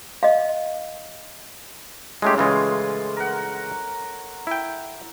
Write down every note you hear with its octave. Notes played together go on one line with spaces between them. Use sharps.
D#5 F5
A2 G#3 A3 C#4 G4 C6
C#3 E3 G#3 F4
A#4 F#5
E4 G5